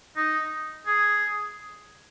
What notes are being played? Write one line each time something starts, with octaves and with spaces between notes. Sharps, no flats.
D#4
G#4